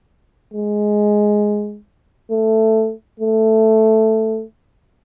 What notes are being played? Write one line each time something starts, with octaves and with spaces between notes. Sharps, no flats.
G#3
A3
A3